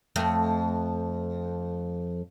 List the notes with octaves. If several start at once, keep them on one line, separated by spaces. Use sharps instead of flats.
F2 A3